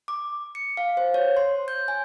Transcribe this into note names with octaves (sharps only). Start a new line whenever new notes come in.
D6
C#7
F5
C5
C#5
C6
G6
G#5